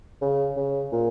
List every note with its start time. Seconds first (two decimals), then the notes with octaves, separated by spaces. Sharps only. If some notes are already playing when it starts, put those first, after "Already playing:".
0.22 C#3
0.57 C#3
0.92 A#2